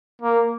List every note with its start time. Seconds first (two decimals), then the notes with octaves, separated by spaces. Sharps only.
0.22 A#3